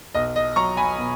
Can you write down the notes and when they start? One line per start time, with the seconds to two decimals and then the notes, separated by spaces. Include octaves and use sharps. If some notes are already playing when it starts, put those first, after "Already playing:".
0.15 B1 D#5
0.36 D#5
0.56 F#3 A#5 C#6
0.77 G#5 B5
0.98 B2